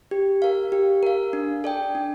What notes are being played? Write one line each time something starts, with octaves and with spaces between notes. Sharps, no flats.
G4
A#4 F5
G4
A#4 F5
D4
A4 D5 G5
D4